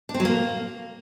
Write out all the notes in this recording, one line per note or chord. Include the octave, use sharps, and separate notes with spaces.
D4
C4
F#3
A#3